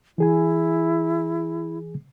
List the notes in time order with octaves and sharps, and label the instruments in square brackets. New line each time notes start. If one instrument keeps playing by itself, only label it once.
[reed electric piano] E3 G#4 G#5 [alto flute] E4